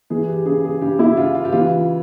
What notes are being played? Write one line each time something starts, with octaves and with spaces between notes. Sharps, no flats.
E3 G#4
G4
C#3 G#4
G#4
C#3 G4
E4
C#3 F4
F4
G4
E3 F4